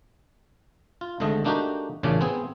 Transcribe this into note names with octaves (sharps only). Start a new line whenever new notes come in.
F4
G#1 G#2 D3 A3 D#5
A3 A#3 D4 D#4 F#4 G4
A1 A#2 C#3 C#4 D4 D5
B3 C4 G#4